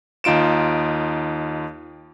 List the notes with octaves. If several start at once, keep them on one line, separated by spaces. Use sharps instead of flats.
D#2 D#4 F4 D7 E7